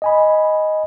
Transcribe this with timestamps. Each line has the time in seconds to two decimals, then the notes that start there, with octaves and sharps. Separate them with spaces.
0.02 D#5 G#5 B5